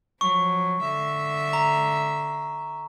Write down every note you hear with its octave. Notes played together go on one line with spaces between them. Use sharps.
F3 F#3 C#6
D3 E5
A#5